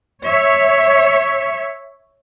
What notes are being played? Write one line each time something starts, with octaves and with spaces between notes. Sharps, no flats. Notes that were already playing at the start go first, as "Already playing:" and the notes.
C#5 E5